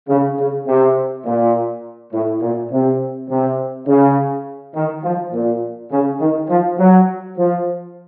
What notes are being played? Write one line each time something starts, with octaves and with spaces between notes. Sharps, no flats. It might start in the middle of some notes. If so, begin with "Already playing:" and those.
C#3
C#3
C3
A#2
A2
A#2
C3
C3
C#3
D#3
F3
A#2
C#3
D#3
F3
F#3
F3